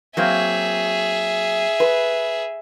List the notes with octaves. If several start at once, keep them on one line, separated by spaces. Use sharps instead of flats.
F#3 A#3 C4 G#4 E5
B4